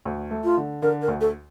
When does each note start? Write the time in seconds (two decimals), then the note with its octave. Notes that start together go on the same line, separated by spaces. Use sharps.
0.05 D2
0.31 A3
0.44 F4
0.57 D3
0.82 D3 A#4
1.02 A#4
1.08 D2
1.21 A4